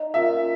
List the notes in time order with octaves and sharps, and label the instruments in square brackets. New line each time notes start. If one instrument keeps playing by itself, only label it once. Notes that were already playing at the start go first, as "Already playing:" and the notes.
Already playing: [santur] D#4
[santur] A#3 C#4 F4 [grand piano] E5